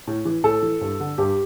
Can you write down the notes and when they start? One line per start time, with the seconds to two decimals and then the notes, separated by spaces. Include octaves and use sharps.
0.07 A2
0.25 E3
0.44 A2 A4
0.62 E3
0.81 G2
1.00 D3
1.18 G2 G4